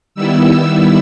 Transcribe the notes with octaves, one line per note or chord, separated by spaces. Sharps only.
D#3 G3 B3 E4 E6